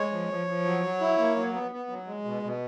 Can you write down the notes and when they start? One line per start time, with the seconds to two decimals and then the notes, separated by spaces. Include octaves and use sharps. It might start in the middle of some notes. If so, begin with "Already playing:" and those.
Already playing: G#3 C#5
0.12 F3
0.29 F3
0.47 F3
0.65 F#3
0.83 F#3
1.01 E4
1.18 A#3
1.36 F#3
1.54 B3
1.71 B3
1.89 F#3
2.07 G#3
2.25 B2
2.43 B2